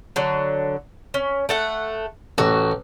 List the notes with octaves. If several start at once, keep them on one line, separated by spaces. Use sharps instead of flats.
D3 F#3
C#4
A3 A4 F#5
A1 F#4